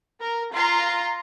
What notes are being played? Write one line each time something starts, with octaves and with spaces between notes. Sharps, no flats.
A#4
F4 A#5 C6